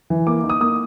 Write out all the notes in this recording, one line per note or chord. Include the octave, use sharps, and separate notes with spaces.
E3
A#3 D6
D#4
D#6
A#3 D#6